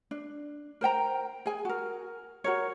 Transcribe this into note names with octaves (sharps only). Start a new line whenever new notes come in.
D4
A#4 C5 G5 A#5
G#4 G#5
F#4 A#4
F#4 A#4 C#5